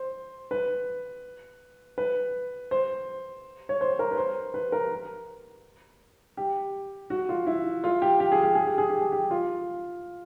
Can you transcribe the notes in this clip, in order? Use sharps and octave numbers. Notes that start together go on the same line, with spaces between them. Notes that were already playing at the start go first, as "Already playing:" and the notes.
Already playing: C5
B4
B4
C5
C#5
C5
A#4
B4
C5
B4
A#4
G4
F#4
F4
E4
F4
G4
G4
G#4
G4
G#4
G4
G#4
G4
G#4
G4
F4